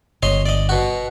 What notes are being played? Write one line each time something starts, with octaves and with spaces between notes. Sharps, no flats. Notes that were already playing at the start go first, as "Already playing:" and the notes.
G1 C#5 D#5 C6
D5 D#5
B2 F#4